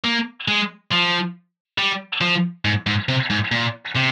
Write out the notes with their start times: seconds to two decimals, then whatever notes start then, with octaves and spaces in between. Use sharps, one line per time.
0.04 A#3
0.48 G#3
0.91 F3
1.78 G3
2.21 F3
2.65 G#2
2.87 G#2
3.09 C3
3.30 G#2
3.52 A#2
3.96 C3